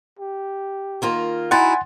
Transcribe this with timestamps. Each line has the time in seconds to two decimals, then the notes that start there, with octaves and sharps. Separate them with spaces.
0.19 G4
1.02 D#3 A#3 F4
1.51 D#4 E4 F#4 F#5 G#5 C6 A6